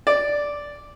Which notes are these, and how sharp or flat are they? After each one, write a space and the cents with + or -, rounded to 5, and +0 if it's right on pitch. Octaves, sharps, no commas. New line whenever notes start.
D5 -5